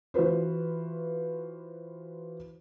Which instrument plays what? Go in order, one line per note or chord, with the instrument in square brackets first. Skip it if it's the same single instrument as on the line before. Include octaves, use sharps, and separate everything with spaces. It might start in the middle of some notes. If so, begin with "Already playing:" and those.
[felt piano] E3 F4 F#4 B4 C5